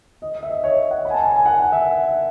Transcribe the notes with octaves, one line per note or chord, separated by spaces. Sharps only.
D#5
D#5
E5
D#5
C#5
F#5
B5
G#5
A5
G#5
G#5
F#5
F#5
E5